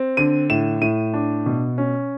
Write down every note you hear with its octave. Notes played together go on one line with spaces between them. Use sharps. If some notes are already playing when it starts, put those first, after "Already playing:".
Already playing: C4
D3 D#7
A2 E7
A2 D#7
D4
B2
C#4